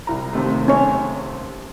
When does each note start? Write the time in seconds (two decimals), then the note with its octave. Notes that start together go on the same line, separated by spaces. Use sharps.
0.07 C2 A#5
0.33 D#2 C3 A3
0.68 C#4 C#5